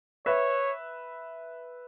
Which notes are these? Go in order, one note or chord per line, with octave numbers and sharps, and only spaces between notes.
B4 C#5 E5